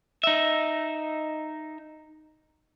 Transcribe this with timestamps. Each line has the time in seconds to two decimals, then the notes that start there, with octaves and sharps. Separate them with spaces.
0.24 D#4 E5